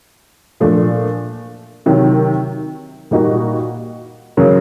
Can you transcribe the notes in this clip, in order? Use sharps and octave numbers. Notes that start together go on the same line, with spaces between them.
A#2 F3 A3 D4
C3 D#3 F#3
A#2 G3 A#3 D#4 F#4
C#3 F#3 A#3